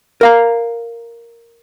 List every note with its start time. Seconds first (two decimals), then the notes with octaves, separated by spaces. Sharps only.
0.21 A#4 F5 A#5